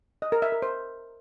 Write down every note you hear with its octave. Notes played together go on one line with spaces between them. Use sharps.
D#5
A#4
E5
A#4
C5